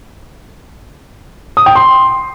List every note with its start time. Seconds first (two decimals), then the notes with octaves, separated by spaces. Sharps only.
1.57 D#6
1.66 G5
1.75 C6